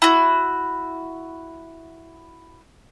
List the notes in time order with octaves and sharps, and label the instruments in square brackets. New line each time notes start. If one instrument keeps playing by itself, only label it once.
[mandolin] E4 F#4